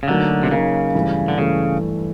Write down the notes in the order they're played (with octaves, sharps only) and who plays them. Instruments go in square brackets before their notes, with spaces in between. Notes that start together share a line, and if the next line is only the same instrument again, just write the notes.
[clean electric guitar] C#3
[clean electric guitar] D2 D3 [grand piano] F#3 A#3 D#4
[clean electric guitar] C3
[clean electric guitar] C#3 [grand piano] F#3 A#3 D#4
[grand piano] G2 E3 A3
[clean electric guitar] D3
[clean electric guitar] C#3 [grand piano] E3 A3